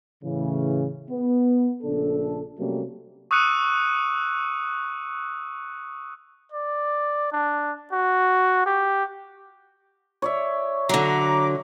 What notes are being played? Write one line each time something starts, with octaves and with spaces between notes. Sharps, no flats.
A2 C#3 E3
B3
A#1 C#3 D4 A4
C3 F#3 G3 A3 A#3 C#4
C#6 D#6 E6 F#6 C#7 D#7
D5
D4
F#4
G4
C#5 D5 E5
D3 F#3 A#5 D6